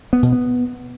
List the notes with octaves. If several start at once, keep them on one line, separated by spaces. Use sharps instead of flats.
B3
B2
B3